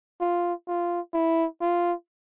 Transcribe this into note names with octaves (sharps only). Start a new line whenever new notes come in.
F4
F4
E4
F4